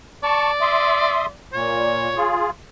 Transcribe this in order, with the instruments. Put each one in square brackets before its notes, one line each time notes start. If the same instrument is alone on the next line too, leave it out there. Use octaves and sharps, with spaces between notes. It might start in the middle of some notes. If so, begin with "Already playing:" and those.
[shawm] D5 [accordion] A5 C#6
[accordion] E5 C6 D#6
[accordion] A#2 [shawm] C#5
[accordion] F4 G#4